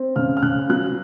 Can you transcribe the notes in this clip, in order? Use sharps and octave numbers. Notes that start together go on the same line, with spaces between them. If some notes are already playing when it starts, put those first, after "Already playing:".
Already playing: C4
C#3 F6
F6
C#3 F#6
F#3 F#6